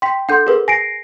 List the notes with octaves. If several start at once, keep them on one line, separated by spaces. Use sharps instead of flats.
G5 C6 B6
D4 A4 F#5 C6 G6
G#4 A#4 B4
G#5 A#6 C7 D7